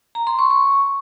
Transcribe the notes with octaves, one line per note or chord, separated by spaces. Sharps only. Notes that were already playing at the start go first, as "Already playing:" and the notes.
A#5
C6
C#6
C#6